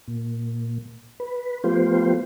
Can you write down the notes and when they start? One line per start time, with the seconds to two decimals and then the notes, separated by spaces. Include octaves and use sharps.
0.08 A#2
1.20 B4
1.64 F3 A3 B3 F4 G4 C5